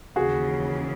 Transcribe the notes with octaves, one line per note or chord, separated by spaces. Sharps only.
D#2 C#3 E3 F#4 G#4